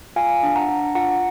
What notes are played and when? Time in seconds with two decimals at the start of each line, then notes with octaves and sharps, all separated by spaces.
0.16 F4 F5 G#5
0.43 D4
0.56 F#5 A#5
0.69 D4
0.95 F4 F#5 A#5